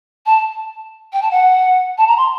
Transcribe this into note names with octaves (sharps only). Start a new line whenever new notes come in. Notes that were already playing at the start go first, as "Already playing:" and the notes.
A5
G5
A5
F#5
A5
A#5
C6